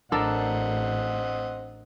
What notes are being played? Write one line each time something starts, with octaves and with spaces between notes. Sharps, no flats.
A1 C4 D4 A4 A#4 D#5 F#5